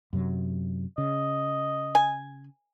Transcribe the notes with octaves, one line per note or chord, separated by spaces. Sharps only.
F#2 C3 F#3
C#3 D#5
G#5